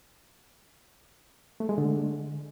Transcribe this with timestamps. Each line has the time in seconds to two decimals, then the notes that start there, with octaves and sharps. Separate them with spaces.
1.60 A3
1.69 G#3
1.78 D3